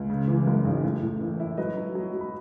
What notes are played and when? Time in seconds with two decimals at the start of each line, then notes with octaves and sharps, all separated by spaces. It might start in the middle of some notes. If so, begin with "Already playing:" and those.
Already playing: C#2
0.10 C#3
0.28 E3
0.47 F#2
0.65 G#1
0.84 A2
1.02 A2
1.21 E3
1.40 E4
1.57 F#3 B4 D#5
1.77 F#3
1.95 F#3
2.13 F#3
2.21 B5